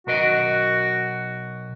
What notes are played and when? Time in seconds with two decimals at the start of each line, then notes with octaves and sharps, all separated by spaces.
0.07 B1 F#4 A#4 D#5